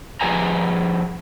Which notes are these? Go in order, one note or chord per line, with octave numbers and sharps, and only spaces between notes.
F3 G4 G#4 B4 G#5 A#5